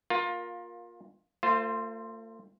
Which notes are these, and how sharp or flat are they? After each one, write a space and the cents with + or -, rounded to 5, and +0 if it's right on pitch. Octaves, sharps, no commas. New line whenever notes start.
A#3 +10 F4 +20 A#4 +20
A3 +40 F4 +0 C5 +0